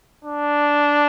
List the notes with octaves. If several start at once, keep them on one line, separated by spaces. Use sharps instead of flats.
D4